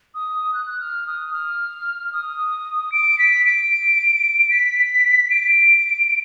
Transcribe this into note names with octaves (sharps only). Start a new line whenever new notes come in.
D#6
F#6
F6
D#6
F6
D#6
D7
B6
D7
B6
D7